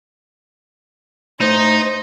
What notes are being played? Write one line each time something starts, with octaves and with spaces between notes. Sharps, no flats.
A2 D#4 C5